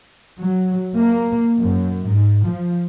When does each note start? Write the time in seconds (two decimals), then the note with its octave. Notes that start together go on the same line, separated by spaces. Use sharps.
0.39 F#3
0.96 A#3
1.58 F#2
2.06 G#2
2.46 F3